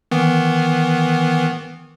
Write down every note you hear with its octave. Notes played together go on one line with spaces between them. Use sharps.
D#3 E3 B3